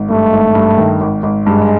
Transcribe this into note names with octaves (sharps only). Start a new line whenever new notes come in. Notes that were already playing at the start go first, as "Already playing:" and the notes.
Already playing: G#1
G2 A3
G#1
G2
D#3
G#1
G#1
G2 G#3